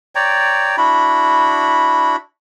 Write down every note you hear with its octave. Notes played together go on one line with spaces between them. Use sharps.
C#5 D5 G5 A#5
D4 E4 F#4 B5